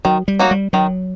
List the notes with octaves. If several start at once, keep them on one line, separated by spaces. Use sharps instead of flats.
D#3 F#3
G3
F#3 A#3 D#4 F#4
G3
D#3 F#3